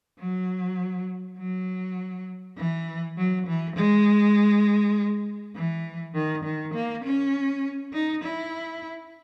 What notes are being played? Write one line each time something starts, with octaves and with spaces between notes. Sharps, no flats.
F#3
F#3
E3
F#3
E3
G#3
E3
D#3
D#3
A#3
C#4
D#4
E4